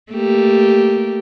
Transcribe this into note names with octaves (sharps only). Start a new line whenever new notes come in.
A3 A#3 G4